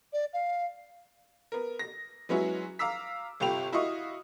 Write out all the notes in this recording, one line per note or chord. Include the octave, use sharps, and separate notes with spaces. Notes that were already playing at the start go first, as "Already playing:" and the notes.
D5
F5
B3 A#4
A#6
F#3 G#3 B3 C#4 E4 F#4
F5 A#5 D6 E6 B6
G1 C3 F4 G5 B5 F7
E4 F#4 D#5 F5 C#6 D#6